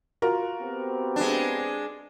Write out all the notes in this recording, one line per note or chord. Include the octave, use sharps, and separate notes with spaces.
F4 F#4 A#4
B3 C4 G4
G#3 D4